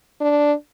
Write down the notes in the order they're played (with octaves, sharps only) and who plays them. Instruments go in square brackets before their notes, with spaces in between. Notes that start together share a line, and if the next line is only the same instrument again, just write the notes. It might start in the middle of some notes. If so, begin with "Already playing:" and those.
[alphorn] D4